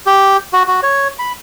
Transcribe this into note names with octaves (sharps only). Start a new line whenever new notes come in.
G4
F#4
F#4
C#5
B5